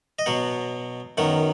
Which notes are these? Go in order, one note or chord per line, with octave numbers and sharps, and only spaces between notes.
D#5
B2 F#3 B3 F#5
F#2 D#3 F#3 B3 F#5